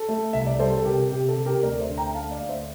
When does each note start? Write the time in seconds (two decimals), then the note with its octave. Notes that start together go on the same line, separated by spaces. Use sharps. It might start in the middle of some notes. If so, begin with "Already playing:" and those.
Already playing: A4
0.09 A3
0.33 C2 E5
0.46 D5
0.59 G3 A4 C5
0.77 A4
0.85 C3 G4 A#4
1.11 C3 G4
1.29 A4
1.37 C3
1.46 G4 A#4
1.62 D2 A#4 D5
1.80 C5 E5
1.89 D3
1.97 G5 A#5
2.14 A3 F5 A5
2.31 D5 F5
2.40 D2
2.49 C5 E5